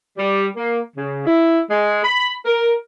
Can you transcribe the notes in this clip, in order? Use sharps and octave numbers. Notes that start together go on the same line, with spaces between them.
G3
A#3
C#3
E4
G#3
B5
A#4